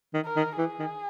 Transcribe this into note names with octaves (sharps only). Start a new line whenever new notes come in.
D#3
A#4
D#3
E3 G#4
D#3